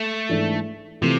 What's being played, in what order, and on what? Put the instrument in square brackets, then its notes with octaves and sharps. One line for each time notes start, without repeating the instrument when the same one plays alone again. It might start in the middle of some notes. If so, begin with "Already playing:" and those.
Already playing: [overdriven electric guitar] A3
[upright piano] G#2 E3 G#3 D4 A4
[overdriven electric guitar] C3 [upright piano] E3 A3 C4 F4